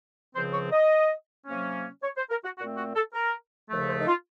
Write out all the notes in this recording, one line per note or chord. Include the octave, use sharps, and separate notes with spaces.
C#2 C#3 F3 C4 C5
C#5
D#5
C3 F#3 A#3 C#4
C#5
C5
A#4
F#4
A#2 A3 C4 F#4
F#4
A4
A#4
D#2 C#3 F3 A3
C5
D#4
F4